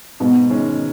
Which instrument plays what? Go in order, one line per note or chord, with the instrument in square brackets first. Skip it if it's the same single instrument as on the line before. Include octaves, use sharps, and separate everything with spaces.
[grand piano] G#2 [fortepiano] B2
[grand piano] D#3 G#3 C#4